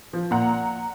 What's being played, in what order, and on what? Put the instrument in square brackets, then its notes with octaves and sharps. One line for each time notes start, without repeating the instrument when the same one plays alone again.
[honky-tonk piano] F3
A#2 F#5 A#5